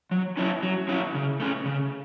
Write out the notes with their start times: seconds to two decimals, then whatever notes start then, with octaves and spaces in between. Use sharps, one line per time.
0.11 F#3
0.37 C#4 E4 C#5 E5
0.63 F#3
0.89 C#4 E4 C#5 E5
1.14 C#3
1.40 A3 C#4
1.66 C#3